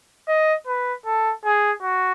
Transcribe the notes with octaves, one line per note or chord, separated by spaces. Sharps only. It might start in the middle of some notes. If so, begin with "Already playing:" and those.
D#5
B4
A4
G#4
F#4